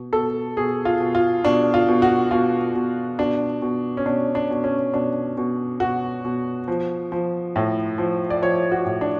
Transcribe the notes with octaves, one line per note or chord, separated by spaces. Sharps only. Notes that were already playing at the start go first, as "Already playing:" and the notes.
Already playing: B2
B2 A4
B2 G#4
F4
B2
F4
B2 D4
F4
B2
F#4
B2 F4
B2
B2 D4
B2
C#4
B2 D4
D4
B2
C#4
B2 D4
B2
B2 F#4
B2
F3
F3
A2
F3
D5
F3 C#5
F#4
A2
D4